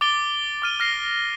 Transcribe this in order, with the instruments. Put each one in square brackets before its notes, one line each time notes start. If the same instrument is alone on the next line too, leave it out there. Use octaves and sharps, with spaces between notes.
[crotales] D6 A6 D7 G7
D6 F6 D#7
F6 A#6 C7 G7